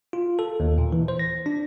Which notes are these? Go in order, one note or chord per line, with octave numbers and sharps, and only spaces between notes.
F4
A4
D#2
A#2
E3
C5
A#6
D4